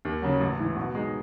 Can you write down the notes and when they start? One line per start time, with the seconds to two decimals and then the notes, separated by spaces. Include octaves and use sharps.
0.05 D#2
0.22 C#3 F#3
0.40 A1
0.59 G#2 E3
0.76 B2
0.95 G#3 D#4